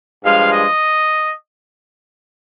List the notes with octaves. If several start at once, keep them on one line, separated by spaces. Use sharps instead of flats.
G2 F3 G#3 F5
D#5